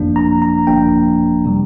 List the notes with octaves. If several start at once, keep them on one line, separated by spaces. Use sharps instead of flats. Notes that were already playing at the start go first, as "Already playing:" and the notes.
Already playing: G1 F2 F3 A#3 D4
A#5
A#5
G1 F2 F3 A#3 D4 G5
C3 G3